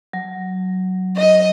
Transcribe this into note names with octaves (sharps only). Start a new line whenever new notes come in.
F#3
D#5